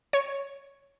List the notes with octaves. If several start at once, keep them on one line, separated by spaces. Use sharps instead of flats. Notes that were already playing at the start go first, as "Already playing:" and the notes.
C#5